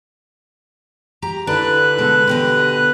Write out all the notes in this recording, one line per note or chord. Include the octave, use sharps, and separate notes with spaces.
G4 A#5
D3 D4 E4 B4 F#6
B2 G#3 A4
B2 G4 D#5